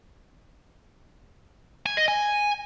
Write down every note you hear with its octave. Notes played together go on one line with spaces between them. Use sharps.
G#5
D#5
G#5